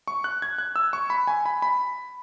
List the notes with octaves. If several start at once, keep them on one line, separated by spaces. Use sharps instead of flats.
C#6
F#6
G#6
F#6
E6
C#6
B5
G#5
B5
B5